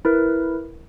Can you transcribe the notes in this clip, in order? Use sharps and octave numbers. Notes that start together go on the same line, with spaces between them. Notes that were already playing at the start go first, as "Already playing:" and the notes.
E4 A#4 B4